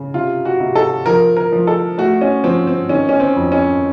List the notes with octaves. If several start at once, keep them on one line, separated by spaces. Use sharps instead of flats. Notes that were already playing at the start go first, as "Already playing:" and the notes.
Already playing: C#3
C3 F4
F#4
C3
A4
F3 A#4
A#4
F3
A4
A3 F#4
C#4
F3 C4
C4
D#3 C#4
C#4
C4
F2
C#4